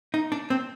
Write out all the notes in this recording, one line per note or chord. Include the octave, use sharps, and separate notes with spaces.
D#4
D4
C4